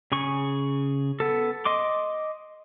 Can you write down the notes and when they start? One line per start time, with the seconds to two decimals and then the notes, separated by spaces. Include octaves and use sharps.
0.12 C#3 G#4 C#6
1.20 B3 A4
1.65 D#5 C6 D6